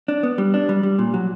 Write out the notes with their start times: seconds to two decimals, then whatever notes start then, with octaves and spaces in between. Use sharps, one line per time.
0.08 D4
0.23 B3
0.38 G3
0.54 D4
0.69 G3
0.83 G3
0.99 A#2
1.14 F#3